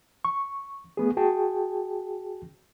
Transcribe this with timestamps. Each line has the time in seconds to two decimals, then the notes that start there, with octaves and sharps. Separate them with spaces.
0.25 C#6
0.97 A3 B3 G#4
1.17 F#4 G#4 G5 A5